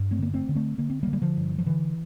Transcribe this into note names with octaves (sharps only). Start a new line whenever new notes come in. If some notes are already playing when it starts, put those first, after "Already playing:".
Already playing: G2
A3 C4
D3 A#3
A3 C4
D3
A3 C4
D3 A#3
C4
D3 G3 A#3
G3
D3 F3
G2
F3
D3 E3